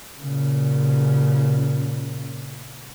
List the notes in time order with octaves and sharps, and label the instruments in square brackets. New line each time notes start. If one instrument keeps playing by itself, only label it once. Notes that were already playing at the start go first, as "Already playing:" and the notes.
[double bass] A#2 C#3